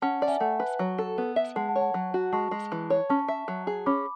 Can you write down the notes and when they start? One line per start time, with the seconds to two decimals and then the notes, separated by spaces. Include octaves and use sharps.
0.02 C#4 F#5 A5
0.22 D5
0.28 E5 G#5
0.40 A3 F#5 A5
0.60 B4
0.79 F#3
0.98 A4
1.18 B3
1.36 E5
1.56 G#3 F#5 A5
1.69 F#5 A5
1.76 C#5
1.81 F#5 A5
1.94 F#3
2.14 F#4
2.33 G#3 A5 C#6
2.51 G#3
2.72 E3
2.90 C#5
3.10 C#4 A5 C#6
3.28 E5
3.48 F#3
3.67 G#4
3.86 C#4 B5 D6